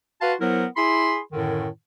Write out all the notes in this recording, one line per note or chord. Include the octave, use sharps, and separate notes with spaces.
F#4 B4 F5 A5 C6
F#3 B3 E4 A#4 C5
E4 G#4 B5 C6
F#2 A2 D3 D#3